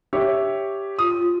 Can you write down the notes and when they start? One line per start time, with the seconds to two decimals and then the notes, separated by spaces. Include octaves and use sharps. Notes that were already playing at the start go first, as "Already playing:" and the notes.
0.13 G4 C#5 E5
0.99 F4 D#6